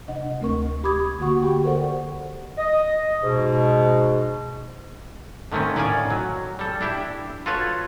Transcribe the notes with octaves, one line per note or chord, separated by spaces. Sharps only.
C3 D4 D#5 F#5
D2 A3 C4 A#4 C#6
D2 G4 B5 D6 D#6 G#6
D3 A#3 F#4 F#5 C#6
G4 G5 C#6
A4 A#4 C5 D5 F#5
D#5
G#2 B2
D3 D#3 A3 C4 C#4
A2 D#3 C#4 D5 F5 G#5
F#3
G3 A4
D4 E4 G4 E5
F4 F#4 A4 B4 C#5